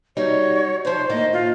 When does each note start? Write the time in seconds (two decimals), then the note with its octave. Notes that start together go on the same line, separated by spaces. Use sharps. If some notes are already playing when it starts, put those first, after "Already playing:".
0.17 G3 D#4 F#4 C#5
0.85 F3 D#4 C5
1.09 A2 D#3 A#3 D#5
1.33 F4